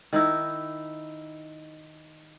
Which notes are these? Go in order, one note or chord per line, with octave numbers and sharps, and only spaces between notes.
D#3 D#4 E4